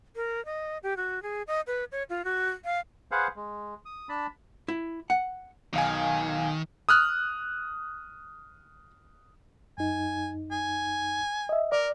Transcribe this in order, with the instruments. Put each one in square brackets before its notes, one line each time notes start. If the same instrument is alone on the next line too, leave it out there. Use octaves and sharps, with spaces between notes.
[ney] A#4
D#5
G4
F#4
G#4
D#5
B4
C#5
F4
F#4
F5
[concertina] G#4 B4 C5 F5 F#5
G#3
D#6
D4 A5 B5
[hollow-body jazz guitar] E4
F#5
[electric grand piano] B1 F5 G#5 [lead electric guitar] D#3
[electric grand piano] D#6 F6 F#6
[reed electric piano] F#2 D#4 [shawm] G#5
[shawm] G#5
[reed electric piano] D#5 E5
[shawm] A#4 [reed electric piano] D5